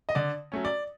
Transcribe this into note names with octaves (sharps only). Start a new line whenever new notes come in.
D#5
D3 D5
F#3 A3 C#4
D5